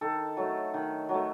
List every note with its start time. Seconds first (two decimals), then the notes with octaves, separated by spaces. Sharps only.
0.01 D#3 A4
0.37 F#3 A3
0.74 D#3
1.09 F#3
1.14 A3